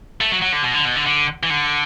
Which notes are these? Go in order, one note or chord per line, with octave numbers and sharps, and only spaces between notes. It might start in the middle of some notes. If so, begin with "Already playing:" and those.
A3
F#3
F#3
D3
B2
D3
B2
D3
D3
E3
D3